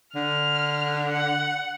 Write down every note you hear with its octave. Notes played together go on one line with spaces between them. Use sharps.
D3 F6
F#5